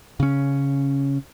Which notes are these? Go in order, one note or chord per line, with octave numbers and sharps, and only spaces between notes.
C#3 C#4